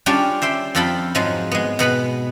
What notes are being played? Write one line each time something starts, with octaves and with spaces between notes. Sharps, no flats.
G3 C#4 D4 F4 G4 D5
C5 E5 G5 C6
F2 F3 F4 A4 G5 B5
G#2 F3 F#3 G#3
G#3 B3
B2 B3 B4 B5